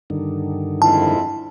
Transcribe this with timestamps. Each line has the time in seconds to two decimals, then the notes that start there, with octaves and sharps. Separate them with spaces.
0.10 G2 D3 D#3
0.82 F2 G#2 E4 A5